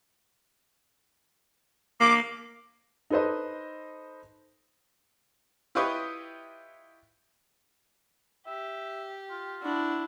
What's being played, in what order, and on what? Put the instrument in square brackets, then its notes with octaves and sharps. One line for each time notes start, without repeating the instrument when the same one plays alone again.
[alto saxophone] A#3 [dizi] D6
[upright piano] D#4 A4 B4 C5 D#5
[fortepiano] E4 F4 G4 B4 C#5 D#5
[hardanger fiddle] G4 [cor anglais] E5
[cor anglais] F4
[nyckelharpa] D4 [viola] E4 [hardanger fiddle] F#4